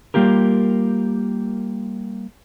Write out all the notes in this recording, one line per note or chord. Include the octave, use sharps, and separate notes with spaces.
G3 A#3 F4 G4 A#4